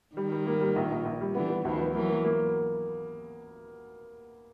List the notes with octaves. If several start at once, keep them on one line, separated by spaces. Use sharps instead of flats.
D#3 G3
G3
A#3
G3
A#1
A#1
A#1
G3
D3 E3 B3
B3
D2 D#3 F3
B3
E3 F#3 A#3
A#3
A#3